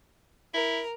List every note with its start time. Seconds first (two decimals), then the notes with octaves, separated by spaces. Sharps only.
0.54 E4 A#4